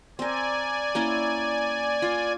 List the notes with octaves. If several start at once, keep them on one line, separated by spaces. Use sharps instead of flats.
C4 A#4 D5 G#5
A#3 C#4 E4
F4